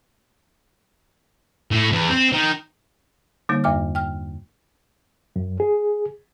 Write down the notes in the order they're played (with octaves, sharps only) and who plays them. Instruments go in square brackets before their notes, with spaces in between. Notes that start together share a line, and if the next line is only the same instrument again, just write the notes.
[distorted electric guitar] A2
E2
C4
D#3
[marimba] D3 G3 A#3 D#4
E2 G2 D#5 D6 F6
G5 F6
[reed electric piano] F#2
G#4